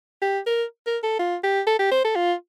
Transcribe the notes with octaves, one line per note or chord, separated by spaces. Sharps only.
G4
A#4
A#4
A4
F4
G4
A4
G4
C5
A4
F4